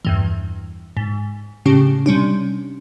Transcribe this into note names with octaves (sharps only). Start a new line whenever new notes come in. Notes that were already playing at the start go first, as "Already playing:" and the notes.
E2 G2 E3
G#2
A2 C#3 C#4 G4
C3 G3 C#4 D4